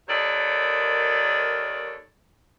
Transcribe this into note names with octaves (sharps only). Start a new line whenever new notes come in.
D#2 D#3 A4 C#5 D5